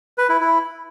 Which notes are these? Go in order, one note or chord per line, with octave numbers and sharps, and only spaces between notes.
B4
E4
E4